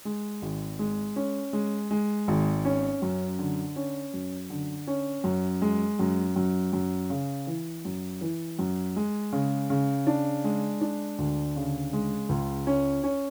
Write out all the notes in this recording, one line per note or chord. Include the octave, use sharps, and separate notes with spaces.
G#3
G#1
G#3
C#4
G#3
G#3
G#1
C#4
F#2
D3
C#4
F#2
D3
C#4
F#2
G#3
F#2
F#2
F#2
C#3
E3
F#2
E3
F#2
G#3
C#3
C#3
D4
G#3
D4
D2
C#3
G#3
C#2
C#4
C#4